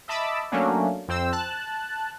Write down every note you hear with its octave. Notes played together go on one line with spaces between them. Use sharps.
D#5 E5 A5 B5 D6 E6
F#3 A3 A#3 C#4 D4
F2 C4 C5 E6
A5 F#6